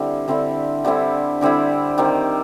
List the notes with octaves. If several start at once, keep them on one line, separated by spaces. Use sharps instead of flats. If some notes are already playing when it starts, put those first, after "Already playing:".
Already playing: D3 G3 C4 E4
D3 G3 C4 E4
D3 G3 C4 E4
D3 G3 C4 E4
D#3 G3 C4